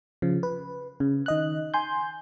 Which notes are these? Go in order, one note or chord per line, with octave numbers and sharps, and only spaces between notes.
C#3 F3
B4
C#3
D#3 D#5 F#6
G#5 C6 G6